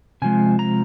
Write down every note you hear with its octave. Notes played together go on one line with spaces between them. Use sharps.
C3 F3 G#3 G#5
A#5